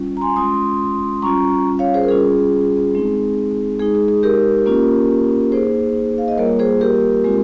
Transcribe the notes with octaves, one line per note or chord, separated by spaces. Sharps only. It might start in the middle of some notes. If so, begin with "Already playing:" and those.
Already playing: G3 C#4 F4
A#5
G#5 C6
G#3 C#4 F4 C6 D#6
G3 C#4 F4 A#5 C#6
C#5 F5
G#4 C5
A#4
G3 C#4 F4 G#4
G#3 C4 D#4
G#3 D#4 G#4
G#4
G#4
G4 A#4
A#3 C#4 F4
A#3 D#4 G#4 C5
F5
D#5
G3 A#3 F4 A#4 C#5
G#4 C5
G4 A#4
G#3 C4 F4